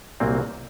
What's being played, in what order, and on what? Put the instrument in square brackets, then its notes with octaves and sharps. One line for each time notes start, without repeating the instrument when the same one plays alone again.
[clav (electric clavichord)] C2 A#2 F#3 A#3 C4